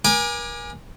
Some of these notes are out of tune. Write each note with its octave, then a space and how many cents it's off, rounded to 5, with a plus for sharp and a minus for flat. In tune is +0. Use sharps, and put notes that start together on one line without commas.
A#4 +40 G#5 -10 D6 +20